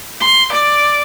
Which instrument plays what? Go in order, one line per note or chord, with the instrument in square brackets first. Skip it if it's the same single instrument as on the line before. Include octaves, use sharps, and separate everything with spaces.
[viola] C6
D5